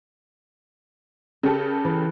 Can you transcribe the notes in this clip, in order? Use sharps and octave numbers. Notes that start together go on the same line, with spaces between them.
C#3 G4 A4 A#4
E3